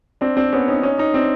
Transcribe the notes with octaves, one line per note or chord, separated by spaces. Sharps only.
C4 D4
C4 D4
B3 C#4
C#4 D#4
C#4 D#4
C#4 D#4
C4 D4